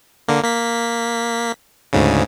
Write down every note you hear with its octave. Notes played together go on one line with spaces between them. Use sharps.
D3 A#3
A#3 B6
D2 G#2 C#3